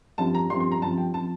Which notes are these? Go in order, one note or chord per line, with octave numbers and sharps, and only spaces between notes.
G2 F3 C4 A5
A#5
G2 F3 C4 C6
C6
A#5
G2 F3 C4 A5
G5
F3 C4 A5